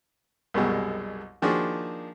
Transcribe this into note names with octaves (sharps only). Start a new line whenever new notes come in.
C2 F#2 B2 G3 G#3
D#3 F3 A#3 D4 F#4 G#4